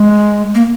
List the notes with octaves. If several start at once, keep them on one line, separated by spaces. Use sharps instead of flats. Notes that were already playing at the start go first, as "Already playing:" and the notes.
Already playing: G#3
A#3